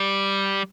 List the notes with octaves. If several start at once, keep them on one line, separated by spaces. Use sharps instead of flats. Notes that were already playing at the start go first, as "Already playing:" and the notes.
Already playing: G3